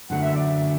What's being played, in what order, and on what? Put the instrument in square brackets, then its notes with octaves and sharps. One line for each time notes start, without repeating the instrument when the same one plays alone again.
[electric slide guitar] F#2 D3 F#3 A3 [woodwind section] F#5
[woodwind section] E5
D5
E5